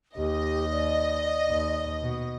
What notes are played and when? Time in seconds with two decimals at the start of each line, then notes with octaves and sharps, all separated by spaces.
0.17 D#2 G4 D#5
0.72 D5
1.48 D#2
2.02 B2